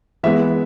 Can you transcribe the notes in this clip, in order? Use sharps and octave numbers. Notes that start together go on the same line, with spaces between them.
E3 G#3 B3 E5